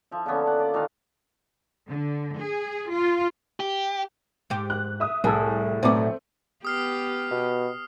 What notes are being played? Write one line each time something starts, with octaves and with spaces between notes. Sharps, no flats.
F3 E5
D3 A#3 B3 C#4
F#5
D5
A#2 D#3 A4 F5
D3
G#4
F4
G4
G#2 G4
F#6
E5 D#6
C2 A2 G#4 A4
B1 A2 A3 B3 C4 D5
B3 G4 D#6 F6 C7
B2